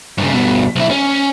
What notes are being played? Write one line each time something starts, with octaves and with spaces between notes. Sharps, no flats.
G2 C#3
G2 B2
B1 E4
C#4